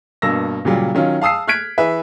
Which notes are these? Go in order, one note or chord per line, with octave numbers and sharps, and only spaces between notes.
G2 B2 A#3 E6 A#6
A#2 C#3 F#3 G3 F4
D#3 F#3 C#4 F4
F5 A5 D#6 E6 C7
F6 F#6 G#6 B6 D7
E3 G#4 B4 E5